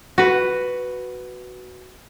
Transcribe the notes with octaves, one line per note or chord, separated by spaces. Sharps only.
F#4 B4